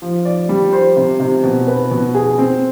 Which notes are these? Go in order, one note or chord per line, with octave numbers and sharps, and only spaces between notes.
F3
D5
G3
C5
C3
C3
B2
B4
B2
G#4
C4